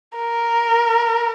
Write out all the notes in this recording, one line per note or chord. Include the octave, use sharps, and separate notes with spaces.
A#4